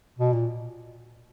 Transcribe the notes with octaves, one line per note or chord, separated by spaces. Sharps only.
B2
A#2